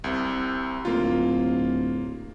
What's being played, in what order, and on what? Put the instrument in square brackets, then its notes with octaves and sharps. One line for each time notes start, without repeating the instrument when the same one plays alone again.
[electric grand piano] C2 C3
[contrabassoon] D1 [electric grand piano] A#3 F4